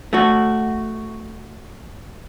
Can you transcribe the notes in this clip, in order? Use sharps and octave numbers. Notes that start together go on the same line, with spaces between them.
A3 F#4